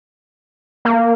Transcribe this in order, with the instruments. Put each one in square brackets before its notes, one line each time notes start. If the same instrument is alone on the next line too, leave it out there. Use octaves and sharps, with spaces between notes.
[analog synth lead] A#3